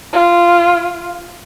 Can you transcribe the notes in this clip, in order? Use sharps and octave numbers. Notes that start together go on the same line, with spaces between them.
F4